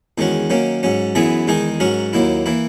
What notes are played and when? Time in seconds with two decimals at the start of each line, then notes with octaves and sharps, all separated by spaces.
0.18 E2 D#3 G#3 C#4 F#4
0.50 D#3 F#3 A#3 C#4
0.83 G#2 F#3 C#4
1.15 F#2 E3 B3 E4 G#4
1.47 E2 D#3 G#3 D#4 G#4
1.80 G#2 F#3 C#4 F#4 A#4
2.13 D#2 D#3 F#3 A#3 E4
2.46 E3 A#3 E4